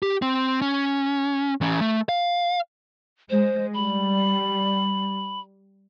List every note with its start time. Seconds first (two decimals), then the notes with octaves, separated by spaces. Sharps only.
0.02 G4
0.22 C4
0.62 C#4
1.61 E3 C#4
1.81 A3
2.09 F5
3.30 G#3 C5
3.74 G3 B5